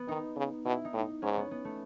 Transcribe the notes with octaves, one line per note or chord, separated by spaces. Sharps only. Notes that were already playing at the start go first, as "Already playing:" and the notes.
Already playing: B3
D#3 D#4
C#3
B2 E4
D#4
A2
D#4
G#2 C#4
B3
B3
A3